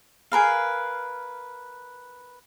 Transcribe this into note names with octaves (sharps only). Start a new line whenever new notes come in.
G#4 A#4 B4 F5